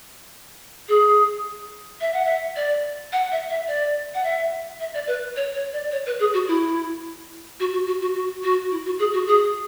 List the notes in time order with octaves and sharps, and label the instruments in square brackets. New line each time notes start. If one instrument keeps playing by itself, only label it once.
[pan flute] G#4
E5
F#5
E5
D5
F#5
E5
E5
D5
F#5
E5
E5
D5
B4
C#5
C#5
D5
C#5
B4
G#4
F#4
E4
F#4
F#4
F#4
F#4
F#4
F#4
E4
F#4
G#4
F#4
G#4